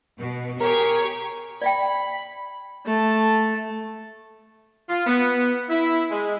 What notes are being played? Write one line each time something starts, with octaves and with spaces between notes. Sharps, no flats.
B2
G4 G#4 A#4 C#5
D5 E5 G5 B5
A3 A5
F4
B3
E4
G#3